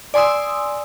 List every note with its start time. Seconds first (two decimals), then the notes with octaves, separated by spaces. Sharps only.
0.14 D5 G#5 C6 D#6 E6